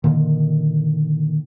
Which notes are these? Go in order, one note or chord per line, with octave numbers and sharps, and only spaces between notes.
A#2 D3 D#3